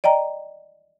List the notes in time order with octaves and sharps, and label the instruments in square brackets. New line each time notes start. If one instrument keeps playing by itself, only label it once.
[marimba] D5 D#5 G5 A#5